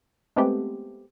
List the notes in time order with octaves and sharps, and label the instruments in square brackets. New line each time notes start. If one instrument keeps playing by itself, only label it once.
[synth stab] G#3 A3 B3 C4 G4